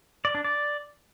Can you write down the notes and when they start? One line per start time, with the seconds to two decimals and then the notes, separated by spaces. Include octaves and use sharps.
0.25 D5
0.35 D4
0.45 D5